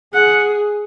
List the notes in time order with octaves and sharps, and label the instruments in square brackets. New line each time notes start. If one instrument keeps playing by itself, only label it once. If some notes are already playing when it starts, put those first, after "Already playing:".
[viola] G#4 [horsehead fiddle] F#5